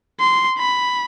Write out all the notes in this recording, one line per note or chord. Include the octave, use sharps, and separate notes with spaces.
C6
B5